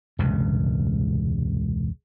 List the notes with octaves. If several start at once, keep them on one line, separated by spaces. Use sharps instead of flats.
E1 C#2 G2 C3